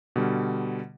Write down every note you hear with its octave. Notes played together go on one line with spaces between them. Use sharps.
B2 D3 G3